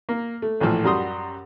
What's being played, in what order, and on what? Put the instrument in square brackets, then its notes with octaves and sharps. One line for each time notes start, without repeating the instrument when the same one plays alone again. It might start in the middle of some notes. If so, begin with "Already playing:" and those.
[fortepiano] A#3
A3
A#1 A2 E3 F3 A4
F#2 G3 F#4 G4 C6 D#6